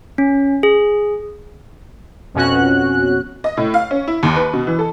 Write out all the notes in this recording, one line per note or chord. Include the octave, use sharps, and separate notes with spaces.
C#4
G#4
F2 B2 C#4 F#4 F#6
D#5
A2
F5
C#4
E4
D#2
B4
B2
E3
A4